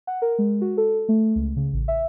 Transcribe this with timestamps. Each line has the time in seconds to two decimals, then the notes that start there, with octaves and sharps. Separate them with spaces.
0.07 F#5
0.22 A#4
0.39 G#3
0.61 F#4
0.77 A4
1.09 A3
1.36 C#2
1.56 C#3
1.73 A1
1.88 E5